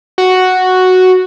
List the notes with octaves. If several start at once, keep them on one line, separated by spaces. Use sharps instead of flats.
F#4